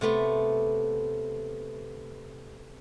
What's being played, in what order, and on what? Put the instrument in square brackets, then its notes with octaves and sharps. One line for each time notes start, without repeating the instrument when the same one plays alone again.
[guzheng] C3 A3 B3 C6